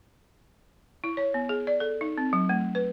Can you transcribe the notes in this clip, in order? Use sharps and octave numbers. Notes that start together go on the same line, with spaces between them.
E4
C#5
B3
G#4
D5
A4
D#4
C4
F#3
A3
B4